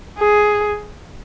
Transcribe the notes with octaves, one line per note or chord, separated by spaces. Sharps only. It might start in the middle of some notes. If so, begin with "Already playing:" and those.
G#4